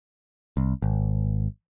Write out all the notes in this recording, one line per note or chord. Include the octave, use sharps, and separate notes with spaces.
C2
G#1